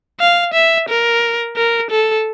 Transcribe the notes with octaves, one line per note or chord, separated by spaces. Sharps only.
F5
E5
A#4
A#4
A4